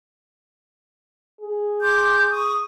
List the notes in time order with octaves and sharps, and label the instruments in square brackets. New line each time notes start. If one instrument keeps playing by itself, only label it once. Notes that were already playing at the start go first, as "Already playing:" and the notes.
[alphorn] G#4
[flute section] C6 D6 G6
C#6 D#6